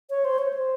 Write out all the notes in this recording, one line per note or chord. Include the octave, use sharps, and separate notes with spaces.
C#5
C5
C#5
C5